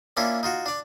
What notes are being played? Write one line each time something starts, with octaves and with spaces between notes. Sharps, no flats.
A#3 C#4 D4 E4 F4
D#4 F4 F#4
D4 D5